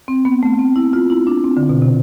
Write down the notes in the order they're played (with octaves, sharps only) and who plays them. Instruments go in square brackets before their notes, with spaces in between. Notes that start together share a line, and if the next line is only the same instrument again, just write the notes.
[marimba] C4
B3
A3
C4
E4
F4
E4
D4
C4
D3
B2
C3